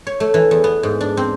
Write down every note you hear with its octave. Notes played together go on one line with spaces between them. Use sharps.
C#5
A3
E3
E2
B3
G#2
D4
C4